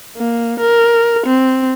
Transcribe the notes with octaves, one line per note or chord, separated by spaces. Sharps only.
A#3
A#4
C4